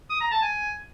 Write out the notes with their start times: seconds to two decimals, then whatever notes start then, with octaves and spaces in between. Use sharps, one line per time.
0.10 D#6
0.21 A#5
0.32 A5
0.42 G#5